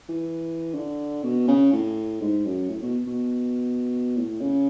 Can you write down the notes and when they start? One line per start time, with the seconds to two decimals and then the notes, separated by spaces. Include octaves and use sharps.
0.09 E3
0.74 D3
1.23 B2
1.48 C#3
1.72 A2
2.21 G#2
2.45 F#2
2.70 A2
2.82 B2
3.07 B2
4.17 A2
4.41 C#3